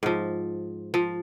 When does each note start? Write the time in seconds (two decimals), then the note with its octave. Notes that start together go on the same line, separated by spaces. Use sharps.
0.03 G#2 F3
0.94 F3